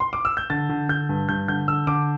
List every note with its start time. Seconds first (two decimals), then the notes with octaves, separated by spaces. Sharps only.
0.00 C6
0.13 D6
0.25 E6
0.37 G6
0.50 D3 A6
0.69 D3
0.89 D3 G6
1.09 G2
1.29 G2 G6
1.48 D3 G6
1.68 D3 E6
1.87 D3 D6